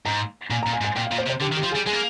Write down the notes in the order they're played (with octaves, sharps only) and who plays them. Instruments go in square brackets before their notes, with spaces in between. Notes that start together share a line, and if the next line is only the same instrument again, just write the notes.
[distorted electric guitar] G#2 [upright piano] A#5
[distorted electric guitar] A#2 [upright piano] G#5
[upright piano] A#5
[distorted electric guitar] A#2
[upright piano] G#5
[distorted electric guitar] G#2
[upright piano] G#5
[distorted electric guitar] A#2 [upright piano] G5
[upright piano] F5
[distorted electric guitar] A#2
[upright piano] C5
[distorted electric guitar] C3
[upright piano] C5
[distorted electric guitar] D3 [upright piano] G4
[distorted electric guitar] D#3
[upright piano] G4
[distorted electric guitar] F3
[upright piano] G#4
[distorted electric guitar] G3
[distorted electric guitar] G#3 [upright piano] G#4
[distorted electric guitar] A#3